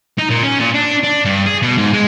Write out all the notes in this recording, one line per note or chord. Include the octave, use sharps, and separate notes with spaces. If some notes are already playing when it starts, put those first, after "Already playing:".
D#4
A#2
C#4
A#2
D4
D4
G2
G#4
B2
G#2
G#3